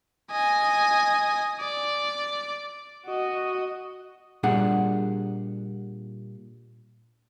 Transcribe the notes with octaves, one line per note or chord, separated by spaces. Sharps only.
D#5 G#5
D5
F#4 D#5
A#2 G3 D4 G#4 F#5